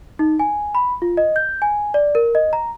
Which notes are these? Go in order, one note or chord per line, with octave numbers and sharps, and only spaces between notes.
D#4
G#5
B5
F4
D#5
G6
G#5
D5
A#4
D#5
A#5